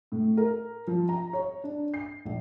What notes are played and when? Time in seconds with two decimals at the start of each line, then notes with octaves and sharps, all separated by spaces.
0.12 A2
0.37 A#4
0.87 F3
1.09 A#5
1.33 C#5
1.64 D4
1.94 C7
2.25 A#1